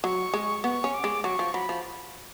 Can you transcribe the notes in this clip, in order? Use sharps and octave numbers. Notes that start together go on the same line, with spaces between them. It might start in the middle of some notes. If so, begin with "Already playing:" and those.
F#3 C#6
G#3
B3 C#6
C#4
D6
G#3
F#3 C#6
F3
F#3 B5
F3